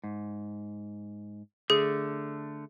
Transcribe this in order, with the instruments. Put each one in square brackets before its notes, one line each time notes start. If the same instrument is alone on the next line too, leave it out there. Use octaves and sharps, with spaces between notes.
[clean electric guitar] G#2
[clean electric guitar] D3 A3 [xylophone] G#4